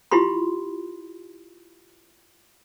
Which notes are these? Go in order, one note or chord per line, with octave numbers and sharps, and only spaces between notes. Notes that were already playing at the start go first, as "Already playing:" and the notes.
E4 F4 G4 B5 C6